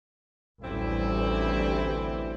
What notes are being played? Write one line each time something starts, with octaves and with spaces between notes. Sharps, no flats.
A1 D2 E3 G3 C4 E4